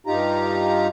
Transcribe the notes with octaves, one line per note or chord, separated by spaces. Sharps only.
G2 D#4 F4 G4 A#5